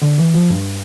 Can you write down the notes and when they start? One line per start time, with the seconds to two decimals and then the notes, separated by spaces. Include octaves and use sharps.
0.02 D3
0.18 E3
0.34 F3
0.50 G2